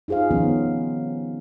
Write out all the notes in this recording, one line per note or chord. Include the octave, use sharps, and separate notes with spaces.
D#4 F4 G#4 C5 F5
D#3 F3 G3 B3 C#4